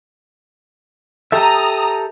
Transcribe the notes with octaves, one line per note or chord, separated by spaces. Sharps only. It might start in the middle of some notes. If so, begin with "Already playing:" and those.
G4 A4 E5 A#5 D#6